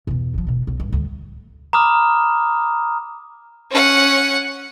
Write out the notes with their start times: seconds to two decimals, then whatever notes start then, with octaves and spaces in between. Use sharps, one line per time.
0.07 E2 B2
0.34 D#3 F3
0.47 E1 B2
0.67 B1
0.80 G2
0.93 D2 G3
1.73 A#5 B5 D6 D#6 F6
3.71 C#4 F#5